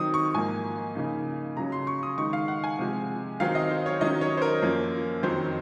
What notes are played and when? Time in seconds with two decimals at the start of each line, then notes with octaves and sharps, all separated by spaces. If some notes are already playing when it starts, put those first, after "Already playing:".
Already playing: D#3 F#3 C4 D#4 D#6
0.14 C#6
0.34 G#2 F3 A#3 G#5
0.95 C#3 F3 A#3 D#4
1.57 C#3 F#3 C#4 A#5
1.72 C6
1.87 C#6
2.03 D#6
2.18 D#3 G#3 D#4 C#6
2.33 F5
2.48 F#5
2.64 G#5
2.79 C3 F3 G#3
3.40 D#3 F#3 C4 D#4 F5
3.55 D#5
3.71 C5
3.86 C#5
4.01 D#3 F#3 C#4 D#5
4.21 C#5
4.37 C5
4.42 A#4
4.62 F#2 F3 A#3 C#4
5.23 F2 D#3 F#3 C4 D#4 C5